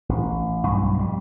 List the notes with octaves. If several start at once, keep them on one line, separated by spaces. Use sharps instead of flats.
A1
B1 G2 F#3
F2 G3